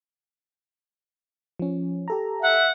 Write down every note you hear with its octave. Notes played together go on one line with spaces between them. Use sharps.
F3 C#4
G4 A4 A#5
E5 F#5